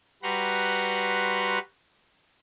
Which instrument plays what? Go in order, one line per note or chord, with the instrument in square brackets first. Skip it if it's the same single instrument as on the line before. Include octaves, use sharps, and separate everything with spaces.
[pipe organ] G3 F#4 B4 F#5 A#5 C6